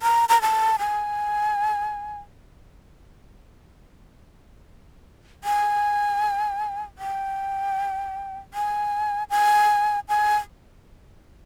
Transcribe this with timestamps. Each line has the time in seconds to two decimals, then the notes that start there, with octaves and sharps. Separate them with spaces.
0.02 A#5
0.29 A#5
0.42 A5
0.79 G#5
5.44 G#5
6.98 G5
8.54 G#5
9.30 G#5
10.09 G#5